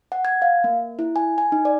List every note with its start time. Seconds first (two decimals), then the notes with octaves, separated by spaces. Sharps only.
0.12 F#5
0.25 G#6
0.42 F5
0.64 A#3
0.99 E4
1.16 G#5
1.38 G#5
1.52 D#4
1.65 D5